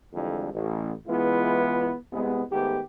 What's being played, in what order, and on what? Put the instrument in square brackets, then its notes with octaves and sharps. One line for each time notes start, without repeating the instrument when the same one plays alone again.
[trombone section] F2 D3 E3 G3 G#3
A1
C#2 E3 G#3 B3 E4 F4
C2 G#3 B3
G#2 D#3 A3 B3 G4